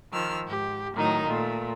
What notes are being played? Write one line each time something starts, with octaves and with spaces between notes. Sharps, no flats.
D#3 F3 E6 F6
G#2 G4
A2 D#3 F#3 D#4
A#2 A3